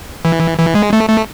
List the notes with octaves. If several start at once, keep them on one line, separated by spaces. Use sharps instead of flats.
E3
E3
G#3
A3
A3